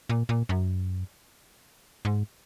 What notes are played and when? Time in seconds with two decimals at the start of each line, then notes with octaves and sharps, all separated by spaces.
0.09 A#2
0.29 A#2
0.49 F#2
2.05 G#2